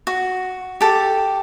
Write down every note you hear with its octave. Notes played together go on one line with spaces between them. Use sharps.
F#4
G4 A4